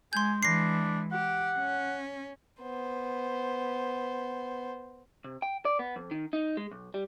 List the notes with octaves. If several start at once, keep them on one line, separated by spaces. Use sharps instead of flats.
G#3 G#5 C6 G6
E3 G#3 D4 A#6 C7
G4 F#5
C#4
B3 C5
C3
G5
D5
B3
F2
D#3
D#4
G#3
B1
G3